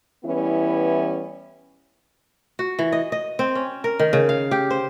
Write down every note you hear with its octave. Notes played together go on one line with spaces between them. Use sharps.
E3 G3 B3 C#4 E4 B4
F#4
E3
D#5
D#5
C4
C#4
A#4
D#3
C#3
F5
G4
C5